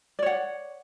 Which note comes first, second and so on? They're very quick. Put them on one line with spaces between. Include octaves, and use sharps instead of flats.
D5 C#5 F#5